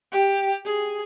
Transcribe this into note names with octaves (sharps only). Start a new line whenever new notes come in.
G4
G#4